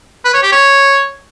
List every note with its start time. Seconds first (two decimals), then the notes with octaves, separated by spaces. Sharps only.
0.25 B4
0.34 C#5
0.43 G4
0.52 C#5